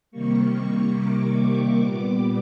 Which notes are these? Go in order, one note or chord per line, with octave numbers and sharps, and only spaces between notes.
C3 D#3 G3 A#3 C#6
D6
A#2 G3 B3 D6